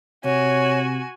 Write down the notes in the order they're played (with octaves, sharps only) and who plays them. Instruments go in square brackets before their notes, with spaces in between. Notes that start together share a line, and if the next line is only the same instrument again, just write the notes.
[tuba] C3 [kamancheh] F#4 G#5 [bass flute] C#5